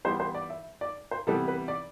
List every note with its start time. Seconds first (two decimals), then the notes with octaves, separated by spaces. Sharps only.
0.05 E3 G3 B3 C5
0.20 C5
0.35 D5
0.50 E5
0.81 D5
1.11 C5
1.27 C3 E3 G3 B3 A4
1.48 B4
1.68 D5